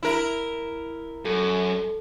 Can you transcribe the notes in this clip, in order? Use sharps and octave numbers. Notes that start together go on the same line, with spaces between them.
E4 A#4
F#2 A4